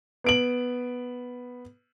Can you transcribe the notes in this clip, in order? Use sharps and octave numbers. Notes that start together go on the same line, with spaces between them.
B3 D7 F#7